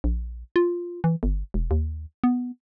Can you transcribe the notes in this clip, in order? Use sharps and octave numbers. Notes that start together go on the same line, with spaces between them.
A#1
F4
E3
G1
E1
D#2
B3